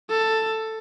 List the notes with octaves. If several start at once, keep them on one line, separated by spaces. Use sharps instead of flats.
A4